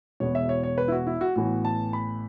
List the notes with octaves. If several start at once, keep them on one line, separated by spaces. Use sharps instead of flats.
E1 E2 B2 B3 C#5
E5
C#5
C#5
B4
E4
F#4
E4
F#4
A1 A2 E3 B3 F#4
A5
B5